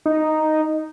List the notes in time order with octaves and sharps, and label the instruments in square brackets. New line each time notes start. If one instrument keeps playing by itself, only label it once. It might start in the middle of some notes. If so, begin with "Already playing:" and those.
[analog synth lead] D#4